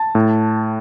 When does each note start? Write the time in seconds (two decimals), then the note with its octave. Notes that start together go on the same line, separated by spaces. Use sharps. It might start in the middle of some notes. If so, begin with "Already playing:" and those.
Already playing: A5
0.15 A2